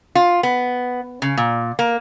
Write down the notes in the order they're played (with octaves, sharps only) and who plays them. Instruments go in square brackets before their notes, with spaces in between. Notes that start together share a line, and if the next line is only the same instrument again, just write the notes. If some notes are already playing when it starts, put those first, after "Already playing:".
[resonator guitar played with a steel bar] F4
B3
C#3
A#2
A#3